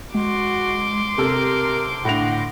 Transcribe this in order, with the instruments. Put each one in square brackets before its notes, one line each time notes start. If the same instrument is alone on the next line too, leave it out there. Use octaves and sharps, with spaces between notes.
[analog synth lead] G#3 [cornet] F#4 [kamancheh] C6 D6
[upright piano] C3 A4 [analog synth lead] G4 [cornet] A#4
[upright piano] A2 D3 F7 [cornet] F#5 [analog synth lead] A#6